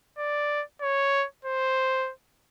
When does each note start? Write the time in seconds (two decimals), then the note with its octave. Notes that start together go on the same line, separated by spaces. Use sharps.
0.18 D5
0.81 C#5
1.45 C5